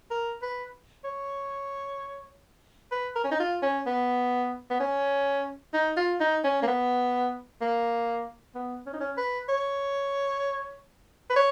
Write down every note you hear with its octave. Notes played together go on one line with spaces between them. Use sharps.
A#4
B4
C#5
B4
A#4
C#4
D#4
F4
C#4
B3
B3
C#4
D#4
F4
D#4
C#4
A#3
B3
A#3
B3
C#4
D#4
C#4
B4
C#5
B4
C#5